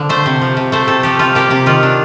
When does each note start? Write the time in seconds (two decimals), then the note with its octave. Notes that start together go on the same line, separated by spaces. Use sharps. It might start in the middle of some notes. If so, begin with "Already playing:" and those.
Already playing: D3 F3
0.09 A3 C5
0.26 C3
0.41 F3
0.57 C3
0.72 A3 C5
0.88 C3 A4
1.03 F3 G4
1.19 C3 F4
1.35 A#3 G4
1.50 C3 G4
1.66 D#3 F4
1.83 D4